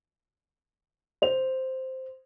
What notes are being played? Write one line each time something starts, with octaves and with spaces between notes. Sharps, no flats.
C5 F7